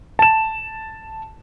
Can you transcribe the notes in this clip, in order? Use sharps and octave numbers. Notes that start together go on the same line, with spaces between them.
A5 E7